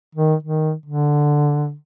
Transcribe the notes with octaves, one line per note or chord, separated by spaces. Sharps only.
D#3
D#3
D3